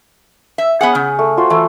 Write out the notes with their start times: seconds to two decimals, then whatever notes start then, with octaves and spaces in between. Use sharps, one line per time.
0.58 E5
0.81 B3 G#4 C#5 F#5
0.95 C#3
1.19 A3
1.37 F4 F#4 C5
1.50 E3 A3